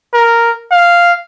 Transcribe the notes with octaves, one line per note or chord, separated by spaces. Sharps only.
A#4
F5